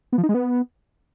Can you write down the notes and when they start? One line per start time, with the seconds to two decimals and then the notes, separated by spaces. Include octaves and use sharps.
0.13 B3
0.18 F3
0.23 D#4
0.29 G#3
0.34 B3